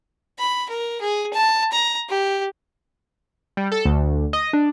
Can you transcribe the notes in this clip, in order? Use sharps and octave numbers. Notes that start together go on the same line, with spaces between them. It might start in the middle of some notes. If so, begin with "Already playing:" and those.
B5
A#4
G#4
A5
A#5
G4
G3
A4
D2
D#5
D4